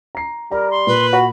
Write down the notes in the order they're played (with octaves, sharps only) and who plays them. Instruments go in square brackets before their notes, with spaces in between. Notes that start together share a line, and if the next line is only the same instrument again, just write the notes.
[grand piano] A#5 C7
[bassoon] G3 [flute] A#4 [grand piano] A#5
[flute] C6
[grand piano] A#2 [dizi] B4
[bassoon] F#4 [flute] B5